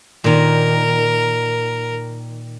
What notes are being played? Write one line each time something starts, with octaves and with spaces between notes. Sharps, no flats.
A#2 D#3 A#4